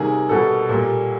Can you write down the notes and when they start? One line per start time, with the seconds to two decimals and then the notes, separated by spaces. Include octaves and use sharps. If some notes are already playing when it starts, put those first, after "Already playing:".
Already playing: C3 D#3 G3 A#3 G#4
0.29 B2 G3 A#3 A4
0.69 A#2 G3 A#3